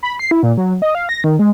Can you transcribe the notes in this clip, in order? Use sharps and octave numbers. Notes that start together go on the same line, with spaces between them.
B5
C7
E4
A#2
F#3
D#5
F5
A#6
D#3
G#3